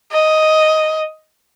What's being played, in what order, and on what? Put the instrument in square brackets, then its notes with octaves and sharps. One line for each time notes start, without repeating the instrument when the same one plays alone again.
[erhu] D#5